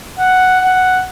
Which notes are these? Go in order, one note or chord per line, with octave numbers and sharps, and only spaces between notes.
F#5
F#5